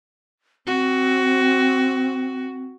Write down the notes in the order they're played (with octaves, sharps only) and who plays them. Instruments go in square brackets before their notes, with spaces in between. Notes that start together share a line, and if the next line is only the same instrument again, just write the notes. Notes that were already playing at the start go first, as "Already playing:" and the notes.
[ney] C4 [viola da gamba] F#4